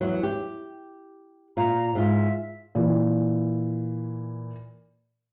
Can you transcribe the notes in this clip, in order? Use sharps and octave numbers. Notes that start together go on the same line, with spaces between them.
E2 F#3
G4
A#2 F4 A#5
G#2 F4 E5
A#2 E3